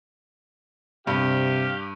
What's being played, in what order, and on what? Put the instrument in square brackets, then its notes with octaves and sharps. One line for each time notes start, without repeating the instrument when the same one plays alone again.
[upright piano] G2 [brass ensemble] C3 [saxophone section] G4 F5